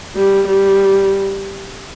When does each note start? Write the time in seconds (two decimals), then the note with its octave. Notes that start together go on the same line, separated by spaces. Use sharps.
0.16 G3
0.47 G3